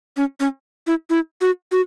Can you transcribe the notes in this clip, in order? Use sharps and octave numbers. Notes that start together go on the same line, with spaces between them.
C#4
C#4
E4
E4
F#4
F#4